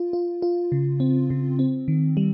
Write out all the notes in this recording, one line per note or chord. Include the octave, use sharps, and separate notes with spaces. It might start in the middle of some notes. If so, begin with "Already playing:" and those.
Already playing: F4
F4
F4
C#3
C4
C#3
C4
D#3
G3